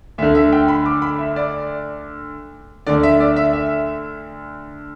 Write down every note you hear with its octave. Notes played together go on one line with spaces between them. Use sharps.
D2 D3 E5
E5
G5
B5
D6
B5
E5
D5
D2 D3 D5
E5
D5
E5
E5